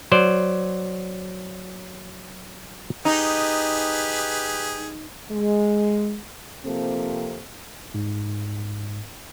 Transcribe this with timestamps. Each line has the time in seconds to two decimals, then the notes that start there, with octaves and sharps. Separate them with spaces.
0.12 F#3 C5 D5
3.05 D#4 G4 G#4 B4
5.31 G#3
6.65 C3 F3 A#3 C4 A4
7.94 G#2